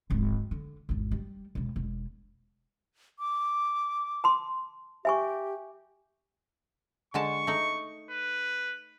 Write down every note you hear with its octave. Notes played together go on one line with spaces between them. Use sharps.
D1 G#1
D3
G#1 E2
G3
E1 B2
E1
D6
A5 C6
G4 E5 G#5 C#6
D3 G#3 A5 C#6
A3 D#4
B4